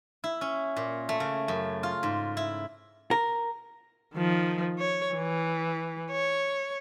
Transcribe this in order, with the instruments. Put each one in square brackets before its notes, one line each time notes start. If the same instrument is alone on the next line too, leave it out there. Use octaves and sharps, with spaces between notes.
[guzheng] E4
C#4
A#2
A3
C#3
F#2
F4
G#2
E4
[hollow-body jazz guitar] A#4
[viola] D#3 F3
C#5
E3
C#5